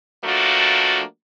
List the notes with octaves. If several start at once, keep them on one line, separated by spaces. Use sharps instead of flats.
F3 A3 A#3 D4 F#4